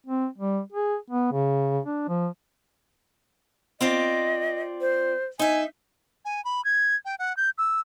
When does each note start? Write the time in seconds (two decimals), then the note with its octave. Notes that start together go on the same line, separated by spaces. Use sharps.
0.06 C4
0.38 G3
0.72 G#4
1.10 B3
1.32 C#3
1.86 D4
2.08 F3
3.81 C4 F4 D5 D#5
4.81 C5
5.39 D#4 E5 G#5
6.25 G#5
6.45 B5
6.65 G#6
7.05 G5
7.19 F#5
7.37 G6
7.58 E6